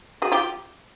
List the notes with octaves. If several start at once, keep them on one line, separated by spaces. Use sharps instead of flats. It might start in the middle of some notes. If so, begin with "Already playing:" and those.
F#4 G#4
F4 G4